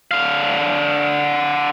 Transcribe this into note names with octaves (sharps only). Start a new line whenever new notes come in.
D3 F5